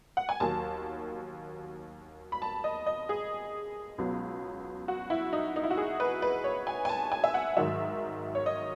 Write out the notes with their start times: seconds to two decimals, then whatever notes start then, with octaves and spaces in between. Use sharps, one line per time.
0.17 F#5
0.29 G#5
0.40 D#2 D#3 F#3 A5
2.32 B5
2.42 A5
2.64 D#5
2.87 D#5
3.09 G#4
3.98 C#2 B2 F#3
4.88 F#4
5.10 E4
5.33 D#4
5.56 D#4
5.64 E4
5.70 F#4
5.77 G#4
6.00 B4
6.22 B4
6.44 C#5
6.67 G#5
6.85 G#5
6.89 A5
7.12 G#5
7.24 E5
7.34 F#5
7.57 G#2 D#3 F#3 E5
8.35 C#5
8.46 D#5